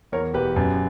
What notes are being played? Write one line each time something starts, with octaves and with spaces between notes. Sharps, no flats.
E2 A#4 C#5
E1 G4 B4
F#2